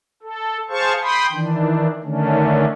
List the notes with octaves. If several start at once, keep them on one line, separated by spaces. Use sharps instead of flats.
A4
G#4 C5 F5 A5 C#6
G5 B5 C6 D#6
D#3 E3 D4
D3 D#3 A3 C#4 D4